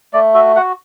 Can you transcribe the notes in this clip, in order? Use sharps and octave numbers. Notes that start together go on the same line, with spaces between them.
A3 D5
F#4 E5
F#4 F#5